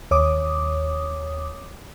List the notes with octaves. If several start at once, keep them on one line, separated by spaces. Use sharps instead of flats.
D#2 C#5 D6 D#6